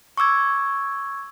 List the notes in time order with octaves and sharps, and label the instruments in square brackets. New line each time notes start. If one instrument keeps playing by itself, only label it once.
[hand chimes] C#6 D6 E6 G#6